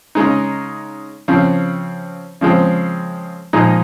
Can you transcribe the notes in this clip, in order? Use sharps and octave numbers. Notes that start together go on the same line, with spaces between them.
C#3 G#3 D#4
C#3 F3 C4
C#3 F3 G#3 C4
A#2 F3 G#3 D#4